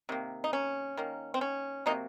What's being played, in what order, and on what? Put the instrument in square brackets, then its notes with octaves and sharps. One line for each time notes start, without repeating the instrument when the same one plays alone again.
[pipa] C3 D#3 A#3
D#4
C#4
D#3 A#3
C4
C#4
C3 F#3 A#3 D#4